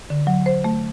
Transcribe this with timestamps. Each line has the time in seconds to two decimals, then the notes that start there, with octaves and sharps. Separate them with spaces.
0.10 D3
0.27 F#3
0.46 C5
0.64 A3